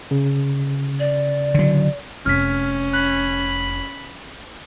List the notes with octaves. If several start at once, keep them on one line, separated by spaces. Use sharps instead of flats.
C#3
D5
D3 F#3
F1 C#4 F6 B6
B5 F#6